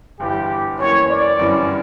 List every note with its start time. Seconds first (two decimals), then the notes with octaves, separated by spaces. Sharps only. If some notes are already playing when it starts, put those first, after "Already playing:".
0.19 G1 G2 E3 G3 G4
0.79 F#2 E3 A#3 C#5
1.09 D5
1.39 G1 F#2 E3 G3 C#4